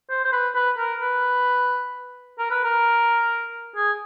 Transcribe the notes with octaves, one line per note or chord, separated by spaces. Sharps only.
C5
C5
B4
B4
A#4
B4
A#4
B4
A#4
G#4